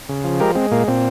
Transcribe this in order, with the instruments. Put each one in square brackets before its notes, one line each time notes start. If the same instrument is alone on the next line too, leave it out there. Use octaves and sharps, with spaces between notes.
[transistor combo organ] C#3
F3
G#3 G4 A#4
G#3 C4
A#2 A#3
A#2 C4